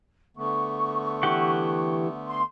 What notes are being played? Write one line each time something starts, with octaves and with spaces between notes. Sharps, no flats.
D3 A3 B3 C#6
E3 G4 F#5
C6